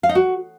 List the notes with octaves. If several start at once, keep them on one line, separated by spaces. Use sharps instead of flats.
F5
D#4
F#4